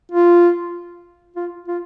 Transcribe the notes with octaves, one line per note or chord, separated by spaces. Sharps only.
F4
F4
F4